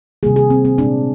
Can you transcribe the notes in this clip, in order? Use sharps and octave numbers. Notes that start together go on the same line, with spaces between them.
C3 D#3 G3 A#3 G#4
G#4
C4
C4
A#2 G#3 C4 D4